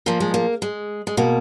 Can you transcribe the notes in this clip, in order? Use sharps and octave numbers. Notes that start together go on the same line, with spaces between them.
A#2 F3 A#3
G#3
A#3
G#3
G#3
B2 A#3